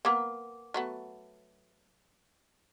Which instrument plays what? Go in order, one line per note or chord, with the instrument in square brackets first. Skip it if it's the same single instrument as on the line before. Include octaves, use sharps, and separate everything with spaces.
[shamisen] A#3 B3 A#4 [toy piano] F#5 G#5 D6
[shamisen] F#3 A3 B3